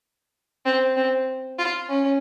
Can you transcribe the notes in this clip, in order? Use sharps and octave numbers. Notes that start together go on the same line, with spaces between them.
C4
C4
F4
C#4